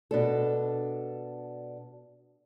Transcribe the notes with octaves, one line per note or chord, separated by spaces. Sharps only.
B2 D4 A4